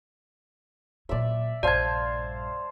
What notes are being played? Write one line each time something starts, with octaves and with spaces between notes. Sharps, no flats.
A#2 F#3 D5 E5
A#1 G2 C5 D5 F5 A5 G#6